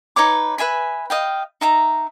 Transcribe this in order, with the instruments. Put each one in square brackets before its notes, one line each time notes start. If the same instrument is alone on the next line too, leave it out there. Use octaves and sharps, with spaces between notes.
[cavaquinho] D#4 B4 C#5 D6
B4 E5 G#5 B5
D#5 F5 G5
D#4 E5 A#5